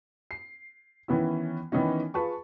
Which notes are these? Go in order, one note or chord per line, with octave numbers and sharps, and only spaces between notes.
C7
D#3 E3 B3 C#4 E4
D#3 E3 B3 C#4 D#4
F4 G#4 B4 A5 C#6